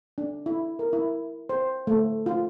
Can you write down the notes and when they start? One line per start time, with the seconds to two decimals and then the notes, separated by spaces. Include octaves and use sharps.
0.18 D4
0.46 E4
0.79 A#4
0.93 E4
1.49 C5
1.87 A3
2.26 F4